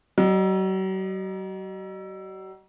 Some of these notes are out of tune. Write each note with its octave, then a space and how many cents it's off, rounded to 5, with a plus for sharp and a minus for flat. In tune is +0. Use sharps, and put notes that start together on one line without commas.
F#3 +40 D#5 -30